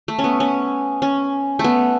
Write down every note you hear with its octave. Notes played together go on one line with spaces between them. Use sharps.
A3
C#4
B3
C#4
C#4
A3
B3